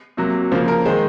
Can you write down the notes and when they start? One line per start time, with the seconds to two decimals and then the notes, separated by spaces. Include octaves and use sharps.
0.17 C3 F#3 A#3
0.52 C#3 F3 A#3 C5
0.68 A#4
0.85 D#3 G#3 C5